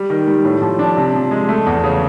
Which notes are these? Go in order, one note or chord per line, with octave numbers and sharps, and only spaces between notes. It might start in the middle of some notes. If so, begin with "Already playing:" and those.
Already playing: G3
D#3
G3
A2
F3
D4
C3
F3
G#3
A3
E2
C#3